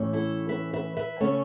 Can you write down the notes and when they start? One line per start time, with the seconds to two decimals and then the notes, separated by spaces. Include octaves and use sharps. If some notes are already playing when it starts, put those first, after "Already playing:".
Already playing: A2 E3 A3 C#4
0.13 E4 A4
0.49 B4 E5
0.73 B4 E5
0.97 B4 E5
1.20 C#3 A3 C#4 A4 C#5